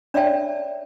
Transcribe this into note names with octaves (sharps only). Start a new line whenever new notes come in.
D4 C#5 D5 E5 G5 A5